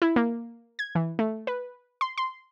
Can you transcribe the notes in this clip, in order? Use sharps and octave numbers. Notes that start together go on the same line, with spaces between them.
E4
A#3
G#6
E3
A3
B4
C6
C6